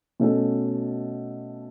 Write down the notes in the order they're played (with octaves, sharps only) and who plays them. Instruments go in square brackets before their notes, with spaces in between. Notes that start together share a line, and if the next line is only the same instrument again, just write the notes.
[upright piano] B2 A3 C#4 F#4 A4